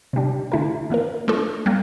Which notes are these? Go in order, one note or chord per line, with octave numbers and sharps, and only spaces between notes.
C3 G3 D4
D3 A3 E4 A#4
E3 A#3 F4 A#4
A3 D4 F4 A4
G3 A#3